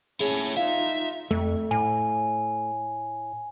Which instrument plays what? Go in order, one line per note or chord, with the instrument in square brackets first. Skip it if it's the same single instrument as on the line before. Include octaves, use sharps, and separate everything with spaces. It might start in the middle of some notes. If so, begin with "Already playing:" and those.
[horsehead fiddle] C#4 G#5 [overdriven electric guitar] E4 C#5 [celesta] G#4
[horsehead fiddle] D#4 F4 [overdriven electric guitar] E5 [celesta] F5
[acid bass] F2 [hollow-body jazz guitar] A3
[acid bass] A2 [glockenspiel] G#5